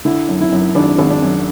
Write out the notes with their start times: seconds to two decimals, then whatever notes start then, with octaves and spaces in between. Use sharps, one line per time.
0.05 D3 E4
0.28 F#2
0.41 E4
0.52 F#2
0.75 G#1 D4
0.99 G#1
1.10 D4
1.22 F#2